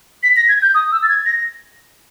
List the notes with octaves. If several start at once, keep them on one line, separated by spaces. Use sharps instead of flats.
B6
A#6
G#6
G6
D#6
E6
A6
G#6
A#6